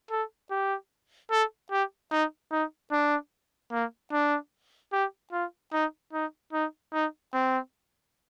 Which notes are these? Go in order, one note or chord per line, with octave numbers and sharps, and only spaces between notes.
A4
G4
A4
G4
D#4
D#4
D4
A#3
D4
G4
F4
D#4
D#4
D#4
D#4
C4